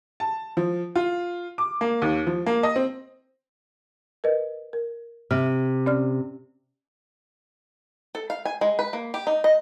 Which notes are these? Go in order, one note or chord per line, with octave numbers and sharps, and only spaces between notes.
A5
F3
F4
D6
A#3
D#2
F3
A#3
D#5
C4
A#4 B4 D#5
A#4
C3 F6
C#4 D5 F6
A4
F5
G#5
G#3
B4
A#3
G4
D#4
D#5